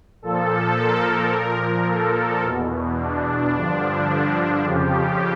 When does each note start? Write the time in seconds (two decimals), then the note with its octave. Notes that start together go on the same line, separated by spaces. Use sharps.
0.22 A#2 F3 A4
0.77 A#4
1.33 A#2 F3
1.88 A4
2.44 E2 B2
2.99 D4
3.54 G2 D3 F3 D4
4.10 D4
4.65 F2 C#3 F3 G4